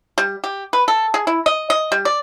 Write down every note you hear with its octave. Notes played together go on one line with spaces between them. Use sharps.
G3
G4
B4
A4
G#4
E4
D#5
D#5
G3
D5